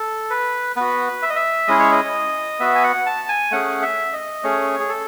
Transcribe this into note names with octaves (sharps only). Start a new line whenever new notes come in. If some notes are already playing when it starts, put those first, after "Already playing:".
Already playing: A4
B4
B3 F#4 B4
E5
D#5
E5
G#3 C#4 E4 G#4 D#5
C#5
D#5
B3 F#4 E5
G#5
F#5
A5
G#5
A3 C#4 G#4 F#5
E5
D#5
A3 C#4 G#4 C#5
G#4
A4